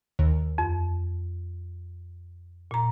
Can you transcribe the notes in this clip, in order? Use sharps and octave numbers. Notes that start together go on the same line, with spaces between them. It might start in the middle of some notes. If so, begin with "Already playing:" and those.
D#2
F2
A#2 A#5